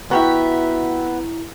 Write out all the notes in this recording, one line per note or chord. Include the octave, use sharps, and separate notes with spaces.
B3 E4 F#4 G4 E5 A#5